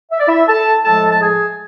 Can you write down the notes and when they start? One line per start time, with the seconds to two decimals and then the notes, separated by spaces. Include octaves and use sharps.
0.12 E5
0.20 D5
0.28 E4 E5
0.48 A4 A5
0.84 A2 F3 G#3 A4 A5
1.09 A5
1.21 G#4 G#5